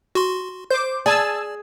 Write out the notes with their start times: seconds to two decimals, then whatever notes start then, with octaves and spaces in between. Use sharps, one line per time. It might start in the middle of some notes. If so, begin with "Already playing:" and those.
0.15 F#4 C6
0.70 C5 D6 G6
1.06 G#4 D5 G#5 A5 E6